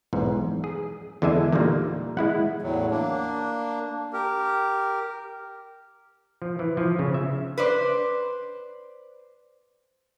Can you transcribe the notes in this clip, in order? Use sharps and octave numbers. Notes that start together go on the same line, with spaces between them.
B1 E2 G#2
G#4
E2 D3 G#3 D4 E5 G#5
A#2 D3 D#3 G3 A#3
G#3 E4 F#5
E2 A2 F#3
A#3 D4
G4 A#4
F3
E3
F3
C#3
E5
B4 C5 D5